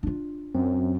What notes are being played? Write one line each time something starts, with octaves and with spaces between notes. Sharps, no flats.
D4 F4
F#2 C4